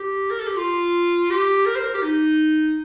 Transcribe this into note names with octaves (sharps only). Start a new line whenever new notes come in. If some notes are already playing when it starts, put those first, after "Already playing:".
Already playing: G4
A#4
A4
G4
F4
G4
A#4
C5
A#4
G4
D#4